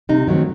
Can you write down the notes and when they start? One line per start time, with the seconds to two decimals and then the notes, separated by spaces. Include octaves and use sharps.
0.09 C3 D#4
0.27 D#3 F#3 A3 C4